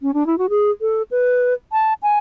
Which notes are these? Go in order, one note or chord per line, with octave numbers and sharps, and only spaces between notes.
C#4
D4
E4
F#4
G#4
A4
B4
A5
G#5